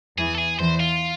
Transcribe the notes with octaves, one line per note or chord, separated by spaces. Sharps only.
E2 E3 G#4
A4
G#4
E2 E3 C5
F4